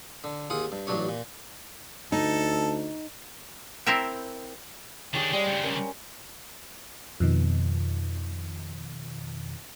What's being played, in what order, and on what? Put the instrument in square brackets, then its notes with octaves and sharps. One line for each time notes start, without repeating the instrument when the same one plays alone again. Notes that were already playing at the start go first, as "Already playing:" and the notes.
[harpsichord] D3
D#2 F4 G#4 F#5
G2
A1 G2 F#3 D4 C#5
A#2
[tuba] D2 [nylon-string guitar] D#4 [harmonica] A4
[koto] C4 E4 A#4 E5 G5
[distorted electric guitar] D#3 D4 [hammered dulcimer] G4 G#4 C#5
[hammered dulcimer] G3 C5 [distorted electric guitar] G#3
[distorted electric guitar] G2 C#3
[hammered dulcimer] C#4 A#4
[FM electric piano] F2 B2 D#3